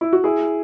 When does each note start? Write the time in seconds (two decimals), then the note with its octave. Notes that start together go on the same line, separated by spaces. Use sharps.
0.01 E4
0.13 F#4
0.24 E4 G#4